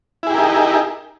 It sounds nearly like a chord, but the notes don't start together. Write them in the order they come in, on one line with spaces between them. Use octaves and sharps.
E4 G#4 G4 A#4 D#4